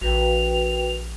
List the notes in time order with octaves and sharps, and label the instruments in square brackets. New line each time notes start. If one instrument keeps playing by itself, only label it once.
[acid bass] A#1 [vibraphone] F#4 B4 G5 [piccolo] F7